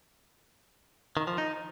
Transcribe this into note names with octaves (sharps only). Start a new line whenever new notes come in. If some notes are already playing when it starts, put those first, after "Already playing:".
D#3
F3
D#4